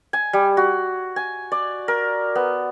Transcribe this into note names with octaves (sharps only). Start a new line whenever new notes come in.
G#5
G3
F#4
G#5
D5
A#4
B3